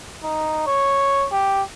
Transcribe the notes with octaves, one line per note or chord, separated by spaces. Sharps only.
D#4
C#5
G4